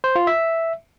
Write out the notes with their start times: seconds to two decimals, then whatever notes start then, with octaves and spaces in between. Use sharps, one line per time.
0.04 C5
0.16 F4
0.27 E5